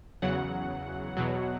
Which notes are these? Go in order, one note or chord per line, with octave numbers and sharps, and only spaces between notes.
E2 C#3 F#3 F#5
E2 B2 F#3